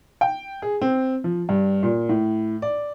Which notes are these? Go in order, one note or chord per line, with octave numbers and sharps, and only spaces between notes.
G5
G#4
C4
F3
G2
A#2
A2
D5